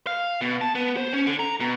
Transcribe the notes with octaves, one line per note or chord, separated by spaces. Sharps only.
F5
B2
A5
B3
C5
C#4
D3
A#5
B2